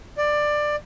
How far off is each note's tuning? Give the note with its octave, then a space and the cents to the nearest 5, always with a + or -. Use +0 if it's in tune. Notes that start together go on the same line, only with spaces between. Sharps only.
D5 +15